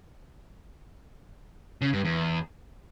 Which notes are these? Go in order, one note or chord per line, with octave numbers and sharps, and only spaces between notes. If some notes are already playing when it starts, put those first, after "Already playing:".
C#3
G2
E2